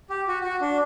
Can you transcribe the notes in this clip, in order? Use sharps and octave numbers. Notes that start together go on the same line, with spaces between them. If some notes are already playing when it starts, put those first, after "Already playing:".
G4
F#4
F#4
D4